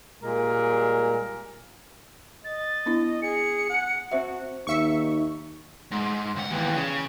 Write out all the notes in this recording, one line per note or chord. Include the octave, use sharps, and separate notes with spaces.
A#2 G3 G#3 A#3 A#4
D#5 A6
B3 D4 E4
G#4 C#7
F#5
C4 F#4 C5 E5
D#2 D#4 E5 C#6
G#2
C#2 F#5
D#2 E3
C#3